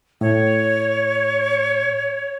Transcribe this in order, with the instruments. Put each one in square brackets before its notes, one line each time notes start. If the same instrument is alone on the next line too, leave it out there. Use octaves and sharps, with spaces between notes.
[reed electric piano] A2 [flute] C#5